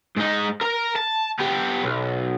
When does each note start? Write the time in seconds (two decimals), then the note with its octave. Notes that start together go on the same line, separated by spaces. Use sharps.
0.17 G#2 D#4
0.61 A#4 A#5
0.95 A5
1.39 B3 G4
1.84 B1